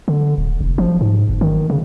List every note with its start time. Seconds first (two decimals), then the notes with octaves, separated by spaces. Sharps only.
0.08 D3
0.38 D1
0.61 F1
0.78 F3
1.01 G#2
1.29 G1
1.41 D#3
1.70 C#3